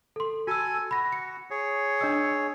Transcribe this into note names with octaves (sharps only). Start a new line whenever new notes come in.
A4 C6
F#4 A4 G#5 E6
F#4 B5 A#6
C#7
G#4 C#5
D4 D#5 E6